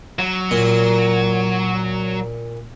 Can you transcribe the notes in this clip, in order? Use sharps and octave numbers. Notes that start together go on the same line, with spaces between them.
F#3
A#2